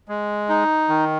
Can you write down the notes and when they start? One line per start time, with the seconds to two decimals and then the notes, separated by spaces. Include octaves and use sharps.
0.08 G#3
0.49 D#4
0.89 D#3